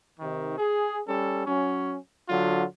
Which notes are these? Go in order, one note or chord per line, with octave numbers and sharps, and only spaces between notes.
C3 D#3
G#4
G3 C#4 A4
F#3 C#4
D3 F#3 F4